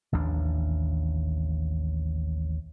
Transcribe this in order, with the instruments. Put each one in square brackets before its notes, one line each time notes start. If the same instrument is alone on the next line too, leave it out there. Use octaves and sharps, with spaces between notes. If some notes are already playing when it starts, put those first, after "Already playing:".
[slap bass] A1 D#2 F3 D4